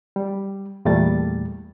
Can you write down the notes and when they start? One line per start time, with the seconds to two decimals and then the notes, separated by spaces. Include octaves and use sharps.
0.16 G3
0.85 E2 A#2 G3 A3 A6